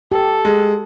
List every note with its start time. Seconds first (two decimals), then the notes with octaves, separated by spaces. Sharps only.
0.12 G4 A4
0.45 G#3